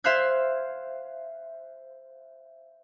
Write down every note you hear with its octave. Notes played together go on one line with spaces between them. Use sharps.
C5 E5 F5 C6 F#6 G#6